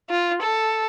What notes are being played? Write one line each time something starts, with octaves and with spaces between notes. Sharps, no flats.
F4
A4